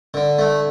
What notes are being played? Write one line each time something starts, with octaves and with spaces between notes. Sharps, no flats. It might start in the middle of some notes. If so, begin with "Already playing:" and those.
D3
A3